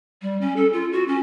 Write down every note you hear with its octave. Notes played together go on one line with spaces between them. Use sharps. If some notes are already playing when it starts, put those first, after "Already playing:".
G3
C#4
A4
F4
F#4
C#4